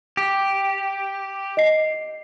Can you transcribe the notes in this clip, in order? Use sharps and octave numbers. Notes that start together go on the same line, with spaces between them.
G4
D#5 C7